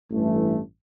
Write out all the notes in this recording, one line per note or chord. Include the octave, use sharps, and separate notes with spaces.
A1 G2 E3 A3